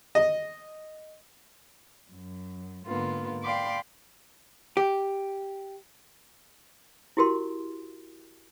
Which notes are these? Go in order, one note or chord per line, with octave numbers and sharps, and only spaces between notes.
D#5
F#2
G#2 D3 A#3 B3 F4
D5 F5 G5 B5 C6 D6
G4
E4 F#4 G4 A#4 C6